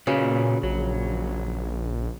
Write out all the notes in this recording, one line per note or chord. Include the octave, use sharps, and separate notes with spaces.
A#2 C#3 F#4 B4 C#5
A#1 F#3